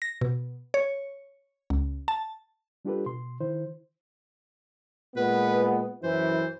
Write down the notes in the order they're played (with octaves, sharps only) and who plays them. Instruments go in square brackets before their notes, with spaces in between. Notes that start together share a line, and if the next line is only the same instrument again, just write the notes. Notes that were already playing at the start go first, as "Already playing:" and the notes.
[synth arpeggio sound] A#6
B2
C#5
C#2
A5
[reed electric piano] G3 D4 F4 G4 A4 B4
B2 C6
D#3 E4 C5
[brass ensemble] A#2 G#3 B3 [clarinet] B4
[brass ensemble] F#2 E3 [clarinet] C5